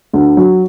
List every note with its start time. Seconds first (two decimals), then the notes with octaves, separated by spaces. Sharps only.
0.13 D2
0.37 F#3